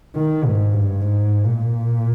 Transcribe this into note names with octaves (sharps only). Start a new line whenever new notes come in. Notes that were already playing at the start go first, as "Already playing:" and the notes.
D#3
G#2
G2
G#2
A#2